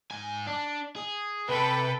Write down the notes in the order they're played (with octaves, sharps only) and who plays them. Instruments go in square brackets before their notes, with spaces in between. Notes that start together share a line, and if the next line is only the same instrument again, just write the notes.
[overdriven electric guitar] G#2 G#5
D4
G#4
[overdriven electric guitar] C3 [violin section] A4 B4 G5